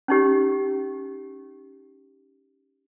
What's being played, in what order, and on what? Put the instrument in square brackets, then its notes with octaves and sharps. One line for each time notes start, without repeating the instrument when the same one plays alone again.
[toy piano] C#4 D#4 G4